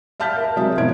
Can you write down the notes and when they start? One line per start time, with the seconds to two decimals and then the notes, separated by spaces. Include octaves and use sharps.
0.20 E5 F5 A5 F6 G6 B6
0.36 A#4
0.56 C3 F#3 G#3 G#4 E5
0.77 G#1 B2 F3 G#6 D7